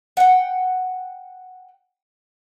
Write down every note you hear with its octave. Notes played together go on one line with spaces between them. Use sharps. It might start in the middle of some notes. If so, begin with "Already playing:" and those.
F#5 G5